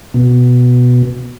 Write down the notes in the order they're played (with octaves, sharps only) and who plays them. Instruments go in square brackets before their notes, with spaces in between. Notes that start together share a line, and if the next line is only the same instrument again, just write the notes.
[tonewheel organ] B2